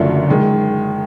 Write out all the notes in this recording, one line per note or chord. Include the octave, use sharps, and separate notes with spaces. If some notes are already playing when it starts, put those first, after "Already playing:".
Already playing: F#1 F#2 D3 F3 A3
D#3 G#3